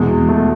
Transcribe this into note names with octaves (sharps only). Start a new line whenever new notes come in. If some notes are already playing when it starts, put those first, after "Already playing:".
Already playing: E2 B2 G#3
A3